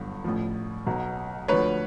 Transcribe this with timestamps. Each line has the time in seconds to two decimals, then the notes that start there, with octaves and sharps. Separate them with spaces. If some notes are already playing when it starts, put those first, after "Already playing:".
Already playing: G1 G2 D3 F#3
0.24 A1 A2 F3
0.86 B1 B2 F#3
1.48 D2 D3 F3 B4 C#5